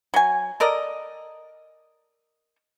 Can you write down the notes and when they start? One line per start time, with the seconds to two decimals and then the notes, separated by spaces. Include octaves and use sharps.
0.14 F#3 G#5
0.60 A4 A#4 D5 D#5